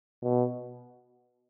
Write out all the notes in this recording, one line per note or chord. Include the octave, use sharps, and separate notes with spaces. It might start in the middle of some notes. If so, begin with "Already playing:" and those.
B2